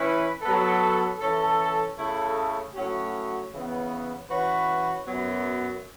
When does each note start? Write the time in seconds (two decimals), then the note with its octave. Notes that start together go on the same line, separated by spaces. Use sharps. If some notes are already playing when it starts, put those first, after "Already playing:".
Already playing: E3 C#4 E4 B4
0.42 F#3 B3 A4
1.19 E3 C#4 A4
1.96 C#3 A3 E4 A4
2.74 A2 F#3 C#4 F#4
3.50 C#3 E3 B3
4.28 E3 C#4 F#4 B4
5.06 F#2 F#3 B3